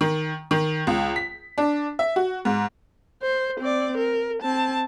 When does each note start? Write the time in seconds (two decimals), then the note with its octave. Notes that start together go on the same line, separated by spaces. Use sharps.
0.01 D#3
0.51 D#3
0.87 C#2
1.16 B6
1.58 D4
1.99 E5
2.16 F#4
2.45 G#2
3.22 C5
3.60 C4 D5
3.98 A#4
4.43 C4 A5